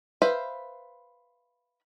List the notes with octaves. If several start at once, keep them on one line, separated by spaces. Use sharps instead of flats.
B4 C5 E5 F5 B5